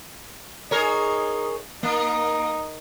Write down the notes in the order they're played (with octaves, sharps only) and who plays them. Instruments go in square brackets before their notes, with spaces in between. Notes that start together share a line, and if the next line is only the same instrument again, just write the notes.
[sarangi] D#4 [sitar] G#4 A#4 C#5
[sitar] A#3 [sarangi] D#4